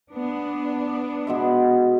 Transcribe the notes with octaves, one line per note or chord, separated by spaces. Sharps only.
B3 D4
B2 G#3 E5